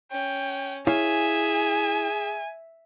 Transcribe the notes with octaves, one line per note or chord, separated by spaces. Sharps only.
C#4 G5
E4 G#4 C#5 E5 F5 G#5